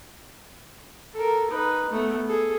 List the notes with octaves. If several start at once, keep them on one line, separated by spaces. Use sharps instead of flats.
A4 A#4
D#4 B4
A3 B3
G#4 A4